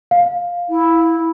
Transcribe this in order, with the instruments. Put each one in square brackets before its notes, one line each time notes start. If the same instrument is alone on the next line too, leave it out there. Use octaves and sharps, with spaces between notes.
[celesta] F5
[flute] E4